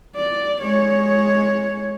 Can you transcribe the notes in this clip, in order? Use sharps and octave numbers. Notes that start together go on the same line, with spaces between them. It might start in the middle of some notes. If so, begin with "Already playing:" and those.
D5
G#3 C#5